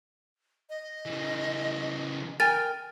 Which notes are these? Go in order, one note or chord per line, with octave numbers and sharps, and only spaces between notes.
D#5
C#3 E3
A#4 G5 G#5 A6